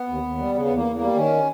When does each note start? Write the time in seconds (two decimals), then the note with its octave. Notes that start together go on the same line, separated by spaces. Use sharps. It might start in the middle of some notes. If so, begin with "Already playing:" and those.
Already playing: B3
0.09 D#2
0.23 D#2
0.39 G3
0.54 C#3 B3
0.65 B3
0.70 E2
0.75 A#3
0.86 E2
0.96 G3 A#3
1.16 D#3 C#4